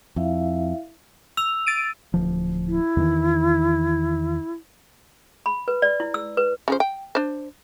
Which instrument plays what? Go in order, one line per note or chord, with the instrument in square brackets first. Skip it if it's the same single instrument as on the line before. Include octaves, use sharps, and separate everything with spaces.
[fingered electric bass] F2 [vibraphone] E4 E5 F5
[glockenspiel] E6 [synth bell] F7
[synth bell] A6 D7 D#7
[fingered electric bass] D1 F3
[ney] E4
[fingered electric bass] E2 D#3 E3
[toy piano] B5
B4
D5
E4
E6
B4
[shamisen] C#3 F3 C5
G5
D4 C5